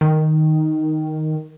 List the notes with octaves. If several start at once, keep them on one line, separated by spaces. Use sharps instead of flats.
D#3